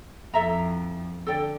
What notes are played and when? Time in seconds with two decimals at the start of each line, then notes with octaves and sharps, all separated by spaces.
0.34 F2 E4 A4 E5 A#5
1.26 D3 A4 D5 G5